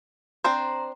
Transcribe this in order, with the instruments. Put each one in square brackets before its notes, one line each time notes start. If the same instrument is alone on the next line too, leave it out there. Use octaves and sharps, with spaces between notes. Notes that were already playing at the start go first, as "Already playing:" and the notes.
[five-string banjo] C4 D4 C5 [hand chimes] A#5 C6